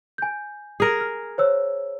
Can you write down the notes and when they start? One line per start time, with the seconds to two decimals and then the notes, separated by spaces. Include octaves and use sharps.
0.18 G#5 G6
0.80 G#4 A#4
1.00 F6
1.38 C5 C#5 E6